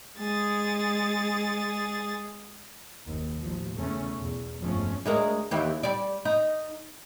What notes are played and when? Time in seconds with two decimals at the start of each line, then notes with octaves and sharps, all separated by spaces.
0.17 G#3 G#4 A6
3.07 F#1 D#2
3.39 A1 F3
3.75 E2 C#3 A3 C#4
4.17 B1 E2
4.59 G1 F2 F3 G#3 A3 C#4
5.05 D2 G#3 A#4
5.51 D#2 E3 G4
5.83 G3 D5
6.25 D#4